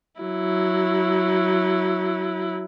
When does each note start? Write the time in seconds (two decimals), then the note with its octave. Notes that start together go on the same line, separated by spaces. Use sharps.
0.21 F#3 E4